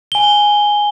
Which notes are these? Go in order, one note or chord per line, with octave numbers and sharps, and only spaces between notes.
G#5 G7